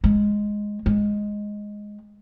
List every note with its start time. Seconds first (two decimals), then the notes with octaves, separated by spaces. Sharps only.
0.04 G#3
0.86 G#3